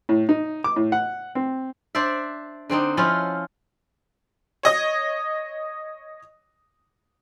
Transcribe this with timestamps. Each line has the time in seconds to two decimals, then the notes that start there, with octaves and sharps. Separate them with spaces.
0.09 A2
0.29 D#4
0.64 D6
0.76 A2
0.92 F#5
1.35 C4
1.95 D4 C5 D5 E5
2.70 D3 C4 D4 D#4
2.97 F3 C#4 E4 F4
4.63 C#5 D#5 D#6